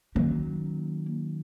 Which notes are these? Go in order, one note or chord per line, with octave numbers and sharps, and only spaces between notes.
D#3 F#3 A3 A#3 C#4